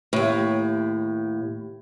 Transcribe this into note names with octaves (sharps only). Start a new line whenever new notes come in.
D#2 A2